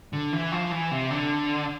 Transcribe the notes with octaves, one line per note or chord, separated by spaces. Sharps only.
D3
E3
F3
E3
C3
D3